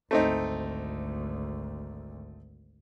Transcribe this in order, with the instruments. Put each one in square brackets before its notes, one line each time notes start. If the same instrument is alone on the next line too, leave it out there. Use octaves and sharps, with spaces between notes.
[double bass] G#1 D2 [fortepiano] A3 C4 D#4